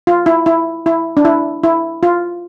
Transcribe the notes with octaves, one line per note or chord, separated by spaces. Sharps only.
F4
E4
E4
E4
D4
E4
E4
F4